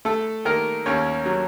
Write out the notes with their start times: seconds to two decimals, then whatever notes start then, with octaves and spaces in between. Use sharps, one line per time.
0.05 A3 A4
0.45 D#3 A#3 A#4
0.86 D#2 C#4 C#5
1.26 F#3